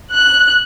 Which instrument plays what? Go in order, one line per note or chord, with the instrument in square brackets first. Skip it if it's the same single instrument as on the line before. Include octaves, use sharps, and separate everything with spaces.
[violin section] F#6